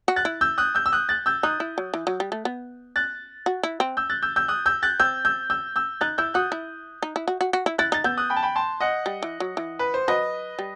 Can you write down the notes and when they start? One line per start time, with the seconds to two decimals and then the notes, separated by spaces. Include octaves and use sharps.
0.08 F#4
0.16 F#6 A6
0.25 E4
0.41 E6 G6
0.58 D#6 F#6
0.75 E6 G6
0.86 E6
0.92 D#6 F#6
1.09 F#6 A6
1.26 E6 G6
1.43 D#4 D#6 F#6
1.60 E4
1.78 F#3
1.94 E3
2.07 F#3
2.20 G3
2.32 A3
2.45 B3
2.96 F#6 A6
3.46 F#4
3.63 E4
3.80 C4
3.97 E6 G6
4.10 F#6 A6
4.23 E6 G6
4.36 E6 G6
4.48 D#6 F#6
4.66 E6 G6
4.83 F#6 A6
5.00 C4 E6 G6
5.25 E6 G6
5.50 E6 G6
5.76 E6 G6
6.01 D#4 F#6 A6
6.18 E4 E6 G6
6.34 F#4 D#6 F#6
6.52 E4
7.02 D#4
7.16 E4
7.28 F#4
7.41 F#4
7.53 F#4
7.66 E4
7.78 E4 F#6 A6
7.92 D#4 A6
8.04 B3 E6 G6
8.17 D#6 F#6
8.30 G5 B5
8.36 A5
8.43 G5 B5
8.56 A5 C6
8.80 D#5 F#5
9.06 G3
9.23 E3
9.40 F#3
9.57 E3
9.79 B4
9.94 C5
10.08 F#3 B4 D#5
10.59 G3